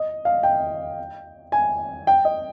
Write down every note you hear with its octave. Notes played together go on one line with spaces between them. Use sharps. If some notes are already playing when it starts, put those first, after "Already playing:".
Already playing: D#5
F5
G5
G#5
G5
D#5